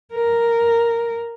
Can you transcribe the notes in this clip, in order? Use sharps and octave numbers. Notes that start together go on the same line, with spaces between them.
A#4